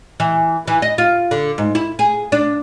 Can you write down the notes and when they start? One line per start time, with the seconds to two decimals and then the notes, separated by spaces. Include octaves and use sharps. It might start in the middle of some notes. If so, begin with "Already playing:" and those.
0.20 E3
0.68 E3
0.82 D#5
0.98 F4
1.31 D3
1.58 G#2
1.75 E4
1.99 G#4
2.32 D4